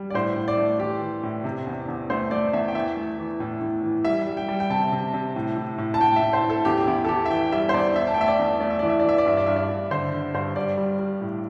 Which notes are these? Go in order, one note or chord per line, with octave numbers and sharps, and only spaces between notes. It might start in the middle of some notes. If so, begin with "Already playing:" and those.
Already playing: G3
D5
A2 C5
A2
D5
A3
E3 G4
E3
A2
C3
E2
E2
A3 C5
A3 D5
E2 E5
G5
E3 E5
A3
E3
A2
A2
E3
G3 E5
G3
G5
G3
G5
C3 A5
C3
C3
A2
A2
A2
A5
A2 G5
E5
A2
C5
A2
A4
E2 G4
G4
E2 E4
A4
E3 G4
E5
E3 G5
G3 E5
C5
E2 D5
E2 E5
A5
G5
A3 E5
D5
E2
A3 D5
E5
E3 D5
E5
D5
E3 E5
D5
G2 E5
D5
G2 E5
D5
G2
D3 C5
D3
G2 C5
G3 D5
G3
G3
A2